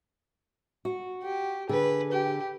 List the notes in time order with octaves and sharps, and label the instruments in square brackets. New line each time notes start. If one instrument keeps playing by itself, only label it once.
[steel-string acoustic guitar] F#4
[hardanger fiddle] G4
[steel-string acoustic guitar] D3 G#4 [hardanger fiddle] B4
[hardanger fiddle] G4